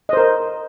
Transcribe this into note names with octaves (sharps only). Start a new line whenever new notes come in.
A#4 C5 D#5